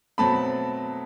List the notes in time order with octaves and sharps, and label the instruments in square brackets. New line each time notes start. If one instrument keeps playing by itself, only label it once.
[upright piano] B2 F#3 A3 C4 A5 B5